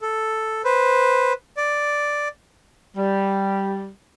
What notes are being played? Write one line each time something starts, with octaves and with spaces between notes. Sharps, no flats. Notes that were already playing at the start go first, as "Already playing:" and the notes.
A4
B4 C5
D5
G3